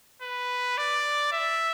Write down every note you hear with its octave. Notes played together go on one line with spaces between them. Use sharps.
B4
D5
E5